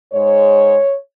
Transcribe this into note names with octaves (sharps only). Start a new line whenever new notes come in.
G#2 G#3 C#5